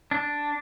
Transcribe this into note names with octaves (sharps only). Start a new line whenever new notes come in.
D4